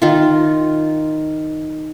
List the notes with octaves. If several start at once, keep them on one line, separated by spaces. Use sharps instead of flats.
D#3 F4